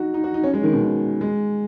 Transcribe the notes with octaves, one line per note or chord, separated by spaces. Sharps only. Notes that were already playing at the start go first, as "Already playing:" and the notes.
Already playing: D#4 F#4
D#4
F#4
D#4
C#4
G#3
D#3
B2
D#3
G#3